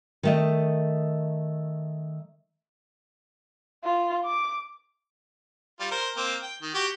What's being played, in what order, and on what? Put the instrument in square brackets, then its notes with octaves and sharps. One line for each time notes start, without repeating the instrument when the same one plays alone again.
[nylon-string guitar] D#3 A3 D#5
[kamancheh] F4
D6
[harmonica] G3 F4
A#4 C5
A#3 C4
G5
D#3
F#4 G4